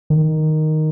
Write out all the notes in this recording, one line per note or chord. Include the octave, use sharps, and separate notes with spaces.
D#3